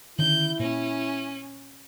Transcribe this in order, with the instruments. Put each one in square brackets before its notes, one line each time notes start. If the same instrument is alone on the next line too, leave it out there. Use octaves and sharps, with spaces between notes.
[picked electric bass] D3 D#3 C#4 [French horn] E4 [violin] G6
[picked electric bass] A#2 [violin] C#4